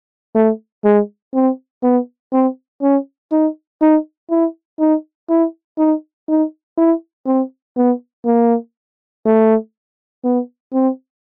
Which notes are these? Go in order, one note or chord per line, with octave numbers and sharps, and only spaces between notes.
A3
G#3
C4
B3
C4
C#4
D#4
D#4
E4
D#4
E4
D#4
D#4
E4
C4
B3
A#3
A3
B3
C4